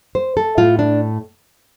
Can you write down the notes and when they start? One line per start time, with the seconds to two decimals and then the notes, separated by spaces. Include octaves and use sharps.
0.15 C5
0.37 A4
0.58 A2 A3 F4
0.79 D4